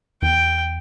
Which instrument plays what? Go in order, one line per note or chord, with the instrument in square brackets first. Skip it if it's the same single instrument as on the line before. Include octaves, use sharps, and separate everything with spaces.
[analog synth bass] E2 [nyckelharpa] G5